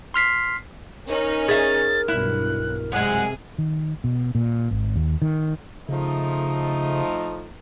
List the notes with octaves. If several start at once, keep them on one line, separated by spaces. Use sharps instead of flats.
C6 F6 B6 C7
C#4 D#4 A#4
G#4 E5 A6
B1 G2 E4 F#6
F#2 C3 G#3 G#4 F#5
D#3
B2
A#2
G#1
D#2
D#3
C#3 F3 A3 D#4